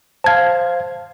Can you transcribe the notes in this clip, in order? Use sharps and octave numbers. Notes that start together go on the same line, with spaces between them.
C5 F5 A5 G#6